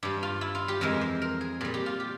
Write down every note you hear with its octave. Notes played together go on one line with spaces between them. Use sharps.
G2 G3 G4
F4
E4
F4
G4
F2 E3 G#3 A#4
C5
A#4
G#4
A#2 G3 G#4
G4
F4
G4